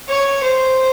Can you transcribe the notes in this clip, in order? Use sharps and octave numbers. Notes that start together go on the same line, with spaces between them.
C#5
C5